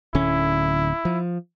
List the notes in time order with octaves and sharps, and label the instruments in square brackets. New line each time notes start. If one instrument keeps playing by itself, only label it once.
[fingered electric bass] D1 D3 C#4 [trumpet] E4
[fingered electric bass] F3